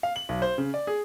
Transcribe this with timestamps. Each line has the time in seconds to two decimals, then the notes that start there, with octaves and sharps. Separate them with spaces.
0.03 F5
0.16 F#7
0.29 B1
0.42 C5
0.58 C#3
0.74 D5
0.87 G#4